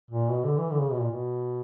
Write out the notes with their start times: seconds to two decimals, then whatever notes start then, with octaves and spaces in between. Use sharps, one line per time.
0.11 A#2
0.30 B2
0.45 D3
0.58 E3
0.71 D3
0.81 C#3
0.91 B2
1.01 A#2
1.12 B2